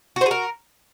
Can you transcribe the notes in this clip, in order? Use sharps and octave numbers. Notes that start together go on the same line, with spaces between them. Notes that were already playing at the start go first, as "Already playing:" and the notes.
F#4 G#4 A#4 C5